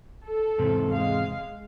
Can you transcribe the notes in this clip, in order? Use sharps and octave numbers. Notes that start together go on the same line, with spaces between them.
A4
E2 G#2 C3
G#3 F5